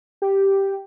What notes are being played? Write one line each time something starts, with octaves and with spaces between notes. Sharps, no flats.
G4